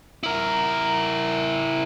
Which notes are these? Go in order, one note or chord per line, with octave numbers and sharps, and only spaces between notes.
E4 A#4